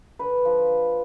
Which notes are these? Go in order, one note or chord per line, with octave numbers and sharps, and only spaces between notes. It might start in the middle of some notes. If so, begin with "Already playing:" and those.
D3 B4
F3